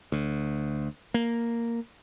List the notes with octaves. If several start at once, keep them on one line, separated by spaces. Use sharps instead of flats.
D2
A#3